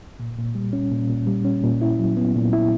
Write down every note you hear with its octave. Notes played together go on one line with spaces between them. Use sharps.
A#2
A#2
G3
C#4
A#2
A#2
G3
C#4
A#2
E4
F#3
B3
A#2
E4